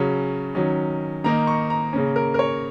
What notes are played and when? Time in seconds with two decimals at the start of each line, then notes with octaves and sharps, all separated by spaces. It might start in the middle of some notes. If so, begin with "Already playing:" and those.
Already playing: C#3 F#3 C#4
0.55 D#3 F#3 C#4
1.24 D#3 A#3 D#4 A#5
1.47 C#6
1.70 A#5
1.93 C#3 A#3 C#4
2.16 A#4
2.34 A#4
2.39 C#5